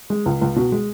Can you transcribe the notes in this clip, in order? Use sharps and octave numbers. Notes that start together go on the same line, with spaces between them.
G#3
C#2
C#2
B2
G#3